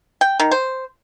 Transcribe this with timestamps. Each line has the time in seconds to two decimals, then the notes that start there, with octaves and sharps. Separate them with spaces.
0.21 G5
0.40 D#3
0.51 C5